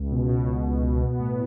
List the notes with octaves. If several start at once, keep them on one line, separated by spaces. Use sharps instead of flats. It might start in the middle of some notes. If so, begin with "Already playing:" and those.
Already playing: C#2
B2
B2
C#2
B2
B2
B3
A2